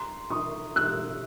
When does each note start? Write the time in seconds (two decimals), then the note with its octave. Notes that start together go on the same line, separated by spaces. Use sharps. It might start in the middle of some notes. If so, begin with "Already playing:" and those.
Already playing: A#5 C6
0.30 C#6 D#6
0.76 E6 F#6